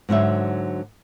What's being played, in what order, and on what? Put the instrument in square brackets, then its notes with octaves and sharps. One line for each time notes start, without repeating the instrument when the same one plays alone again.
[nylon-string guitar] G#2 D3 F#3 E5